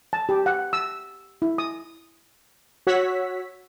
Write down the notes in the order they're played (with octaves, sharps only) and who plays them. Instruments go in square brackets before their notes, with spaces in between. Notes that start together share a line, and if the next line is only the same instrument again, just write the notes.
[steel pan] A5
G4
F#5
E6
E4
D#6
[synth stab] F#4 C#5 F#5 E6 B6